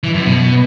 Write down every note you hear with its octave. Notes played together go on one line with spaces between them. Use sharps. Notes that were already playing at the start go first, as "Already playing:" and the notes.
E3
F#2
B2